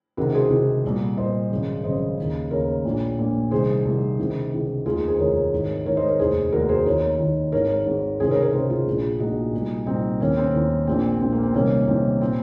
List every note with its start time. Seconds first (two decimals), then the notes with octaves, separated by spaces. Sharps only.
0.17 C#2 C3 D#3 F#4 A#4
0.34 G#4 C5
0.50 C#2 C3 D#3
0.85 C2 A#2
1.17 C2 A#2 C5 D#5
1.51 G#1 F#2 C#3
1.84 G#1 F#2 C#3 C5 D#5
2.18 D#2 C#3
2.51 D#2 C#3 A#4 C#5
2.85 A#1 A#2
3.18 A#1 A#2
3.51 C2 C3 D#3 G#4 C5
3.85 C2 C3 D#3
4.19 C#2 C3 D#3
4.52 C#2 C3 D#3
4.86 F1 D#2 D#3 F4 G#4
5.08 G#4 C5
5.19 F1 D#2 D#3 A#4 C#5
5.52 G#1 G#2 D#3
5.86 G#1 G#2 D#3 A#4 C#5
5.97 C5 D#5
6.08 A#4 C#5
6.19 F1 D#2 D#3 G#4 C5
6.52 F1 D#2 D#3 F#4 A#4
6.69 G#4 C5
6.86 D#2 D#3 A#4 C#5
7.19 D#2 D#3
7.52 G#1 G#2 D#3 A#4 C#5
7.86 G#1 G#2 D#3
8.20 C#2 C3 D#3 G#4 C5
8.31 A#4 C#5
8.42 A#4 C#5
8.53 C#2 C3 D#3 G#4 C5
8.70 F4 G#4
8.87 A#1 A#2
9.20 A#1 A#2 D#4 F#4
9.53 C2 A#2
9.86 C2 A#2 C4 D#4
10.20 D#2 D#3 A#3 C#4
10.37 C4
10.54 D#2 D#3
10.87 A#1 A#2 C4
11.20 A#1 A#2 C4
11.32 A#3
11.43 C4
11.54 C2 C3 D#3 A#3 C#4
11.87 C2 C3 D#3 C4
12.21 A#2 C4